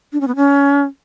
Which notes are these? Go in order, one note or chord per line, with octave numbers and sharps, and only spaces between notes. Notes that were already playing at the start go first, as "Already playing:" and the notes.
D4
C#4
B3
C#4